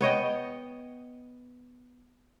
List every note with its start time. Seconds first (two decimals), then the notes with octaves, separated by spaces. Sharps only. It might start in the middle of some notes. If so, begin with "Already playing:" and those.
0.01 B3 C#5 D#5 G5